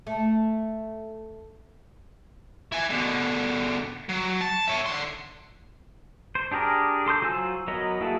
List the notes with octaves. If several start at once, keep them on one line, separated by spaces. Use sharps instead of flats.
A3
E4 G#5
B2 D3
F#3
A5
C#5 E5
D3 C6
C5
D4 G4 G#4 A#4
A4 C6 D6 G6
F#3 F4 C5 G#5 E6
F#3 B3 A#4 C#5 D#5
A#3 E4 F#4 G#4 A4